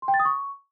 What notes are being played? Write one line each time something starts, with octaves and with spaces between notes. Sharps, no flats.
C6
G5
A6
D#6
C#6